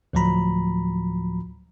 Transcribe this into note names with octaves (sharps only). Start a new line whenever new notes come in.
D2 A2 F3 F#3 A#5 B5